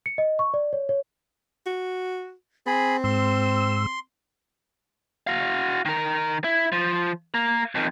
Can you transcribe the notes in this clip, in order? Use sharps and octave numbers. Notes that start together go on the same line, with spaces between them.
C#7
D#5
C#6
D5
C#5
C#5
F#4
C4 G#4 B5
G#2 C6 E6
F#4 F5
D#3 A#4
E4
F3
A#3 A#4
F2 D#3